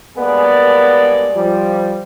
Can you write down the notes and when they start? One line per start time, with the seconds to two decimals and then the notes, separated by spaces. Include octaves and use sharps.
0.17 G2 G#3 A#3 B3 D5
1.35 F3 G3